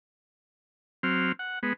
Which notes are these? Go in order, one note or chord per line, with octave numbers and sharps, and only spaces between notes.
F#3 C4 F6
F#5
G#3 B3